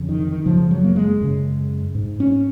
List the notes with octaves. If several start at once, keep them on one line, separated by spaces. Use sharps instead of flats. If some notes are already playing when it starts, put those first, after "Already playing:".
Already playing: F2 C#3
D#3
D#3
F#2 C#3 F3
F#3
A#3
G#3
F#2 C#3
G#2
C#4